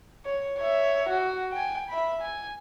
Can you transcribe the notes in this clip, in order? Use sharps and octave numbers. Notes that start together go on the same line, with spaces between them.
C#5
C#5 E5
F#4
G5 G#5
E5 B5
G#5